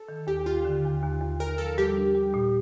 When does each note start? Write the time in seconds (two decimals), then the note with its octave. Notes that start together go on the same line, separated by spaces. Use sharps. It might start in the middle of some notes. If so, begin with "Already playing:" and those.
Already playing: A4
0.08 D#3
0.27 D#2 G4
0.46 D#2 F4
0.65 D3
0.84 D#2
1.02 D#2
1.21 D#2
1.40 D#2 A#4
1.58 F3 A4
1.78 G3 G4
1.97 D4
2.15 G3
2.34 A#2